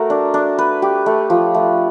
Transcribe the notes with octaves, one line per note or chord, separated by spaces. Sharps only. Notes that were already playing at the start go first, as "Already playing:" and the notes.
Already playing: A3 F#4 A#4
D4
D4
B4
G4
A3
F3
A3